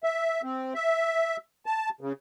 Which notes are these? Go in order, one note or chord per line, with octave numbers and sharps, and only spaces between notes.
E5
C4
E5
A5
C#3